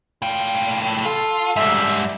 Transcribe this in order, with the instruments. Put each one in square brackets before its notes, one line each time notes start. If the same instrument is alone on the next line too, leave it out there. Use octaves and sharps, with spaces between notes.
[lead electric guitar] A2 G5 [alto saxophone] F4
[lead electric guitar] F4 [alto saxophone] A4
[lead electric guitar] G#2 G3 [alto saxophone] E5